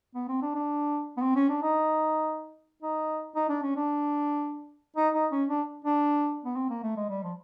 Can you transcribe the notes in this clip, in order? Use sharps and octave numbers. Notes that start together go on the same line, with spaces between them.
B3
C4
D4
D4
B3
C4
C#4
D4
D#4
D#4
D#4
D4
C#4
D4
D#4
D#4
C#4
D4
D4
B3
C4
A#3
A3
G#3
G3
F3